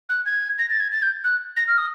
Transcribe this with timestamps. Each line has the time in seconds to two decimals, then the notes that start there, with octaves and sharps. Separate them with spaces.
0.09 F#6
0.25 G#6
0.58 A#6
0.69 A6
0.80 G#6
0.92 A6
1.02 G6
1.24 F#6
1.56 A#6
1.67 F6
1.77 D#6